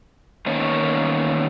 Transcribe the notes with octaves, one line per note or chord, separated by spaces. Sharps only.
D#3 A#3 B3 C#4 C#5